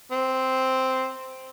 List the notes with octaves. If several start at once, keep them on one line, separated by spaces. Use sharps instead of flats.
C4